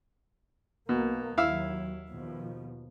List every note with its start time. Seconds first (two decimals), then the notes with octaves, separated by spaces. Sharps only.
0.89 B1 B2 A#3
1.38 D#2 F#3 E4 F5 E6
2.11 D#2 B2 F3